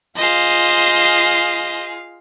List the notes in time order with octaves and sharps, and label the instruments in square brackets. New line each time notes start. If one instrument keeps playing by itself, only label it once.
[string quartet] F4 G#4 F5 [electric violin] C5 D#5